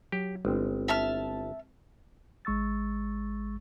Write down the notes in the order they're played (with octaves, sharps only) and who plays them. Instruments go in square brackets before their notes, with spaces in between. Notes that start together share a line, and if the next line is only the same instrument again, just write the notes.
[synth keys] F#3 [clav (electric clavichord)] G4
[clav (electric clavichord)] G1 [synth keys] G#3 C4 E4
[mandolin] E5 A5 F6
[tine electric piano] G#1 G#3 C#6 E6 A6